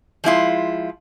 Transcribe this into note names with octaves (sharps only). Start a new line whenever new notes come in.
F3 G#3 E4 F4